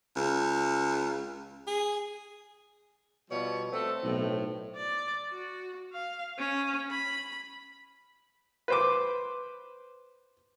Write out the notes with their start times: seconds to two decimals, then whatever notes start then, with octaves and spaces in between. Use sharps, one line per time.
0.16 C#2
1.67 G#4
3.31 B2 F3 G3 C#5
3.73 A3 C4 A4
4.04 B1 A2
4.76 D5
5.30 F#4
5.93 F5
6.38 C#4
6.91 B5
8.68 B4 C5 D6